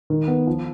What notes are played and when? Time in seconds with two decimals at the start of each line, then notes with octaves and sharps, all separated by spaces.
0.10 D#3
0.28 B3
0.47 F3